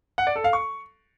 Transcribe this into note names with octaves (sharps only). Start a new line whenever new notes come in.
F#5
D5
A4
F5
C#6